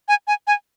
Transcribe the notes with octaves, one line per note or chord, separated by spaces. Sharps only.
G#5
G#5
G#5